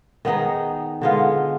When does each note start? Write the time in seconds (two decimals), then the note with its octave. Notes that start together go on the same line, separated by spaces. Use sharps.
0.25 D#3 B3 D#4 G#4
1.02 D3 G#3 B3 F4